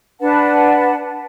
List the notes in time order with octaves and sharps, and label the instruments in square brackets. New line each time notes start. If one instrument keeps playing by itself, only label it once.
[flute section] D4 B4 F#5 A5